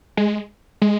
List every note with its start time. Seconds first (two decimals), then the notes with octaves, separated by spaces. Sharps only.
0.17 G#3
0.82 G#3